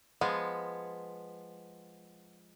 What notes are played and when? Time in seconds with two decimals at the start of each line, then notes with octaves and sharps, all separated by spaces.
0.21 F3 G#3 B3 G#5